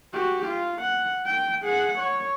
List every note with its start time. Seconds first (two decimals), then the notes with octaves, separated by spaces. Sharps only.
0.14 F#4 G4
0.48 F4
0.81 F#5
1.26 G5
1.63 G#4 F#5
1.99 C#5